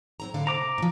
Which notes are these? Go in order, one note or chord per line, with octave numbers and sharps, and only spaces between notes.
F#3 C4 A#5
A2 D3 F5
C3 A#5 D6
A2 F3